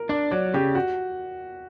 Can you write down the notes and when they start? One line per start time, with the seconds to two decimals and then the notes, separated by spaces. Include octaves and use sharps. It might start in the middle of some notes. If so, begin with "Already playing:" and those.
Already playing: A#4
0.09 D4 D5
0.31 F#3 D5
0.54 C#3 G4
0.75 F#4